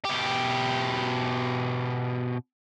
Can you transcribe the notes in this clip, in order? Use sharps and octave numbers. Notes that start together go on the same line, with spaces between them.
B2 G4